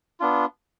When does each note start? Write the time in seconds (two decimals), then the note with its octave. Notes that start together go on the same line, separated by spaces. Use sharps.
0.20 B3 D4 F4